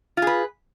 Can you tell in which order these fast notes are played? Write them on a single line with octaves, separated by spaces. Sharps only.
F4 G#4 B4